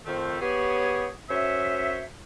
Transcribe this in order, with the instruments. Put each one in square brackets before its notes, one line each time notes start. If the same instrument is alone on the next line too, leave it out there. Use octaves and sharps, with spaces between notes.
[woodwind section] F2 D#3 A3 C5
B3 G4 G#4 C#5
F#2 C#4 C5 C#5 E5